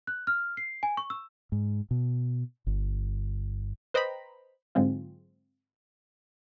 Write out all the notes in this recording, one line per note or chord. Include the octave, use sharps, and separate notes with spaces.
F#6
F6
C7
G#5
C#6
E6
G#2
B2
G1
B4 C5 D#5 G5 A#5 B5
G#2 D3 F#3 G#3 C4 F4